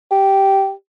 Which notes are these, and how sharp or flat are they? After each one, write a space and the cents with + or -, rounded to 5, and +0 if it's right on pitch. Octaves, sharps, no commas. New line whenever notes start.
G4 -10